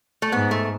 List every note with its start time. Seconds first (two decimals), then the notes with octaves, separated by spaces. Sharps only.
0.22 A3
0.32 G#2 B3
0.51 A3